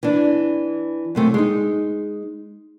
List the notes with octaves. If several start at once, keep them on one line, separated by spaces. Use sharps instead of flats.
E3 D4
F#2 C3 A3
G#3 D#4